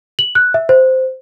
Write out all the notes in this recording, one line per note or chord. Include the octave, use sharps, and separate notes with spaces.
F#7
F#6
E5
C5